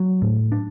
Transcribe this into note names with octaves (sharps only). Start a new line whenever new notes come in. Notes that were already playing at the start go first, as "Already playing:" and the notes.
Already playing: F#3
A2
D4